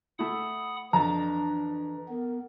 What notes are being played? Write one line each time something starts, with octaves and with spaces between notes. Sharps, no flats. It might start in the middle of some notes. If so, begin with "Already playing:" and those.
A3 E4 F#5 B5 D#6
F2 E3 D4 A5 A#5
B3 A#4